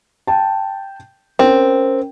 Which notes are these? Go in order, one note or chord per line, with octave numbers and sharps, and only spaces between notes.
G5 A5
C4 C#4 A#4